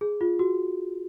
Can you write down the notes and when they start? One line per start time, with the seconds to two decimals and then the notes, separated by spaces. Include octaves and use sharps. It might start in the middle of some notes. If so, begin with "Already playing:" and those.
0.01 G#4
0.21 F4
0.39 F#4